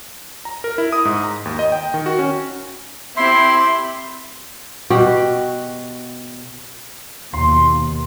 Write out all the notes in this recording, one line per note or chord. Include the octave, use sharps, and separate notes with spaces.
A#5
A#4
E4
D#6
G#2
A#5
D#2
D#5
G5
D#3
F#4
C#4
C4 E4 G4 E5 C6
B2 F#4 G4
D#2 B2 C6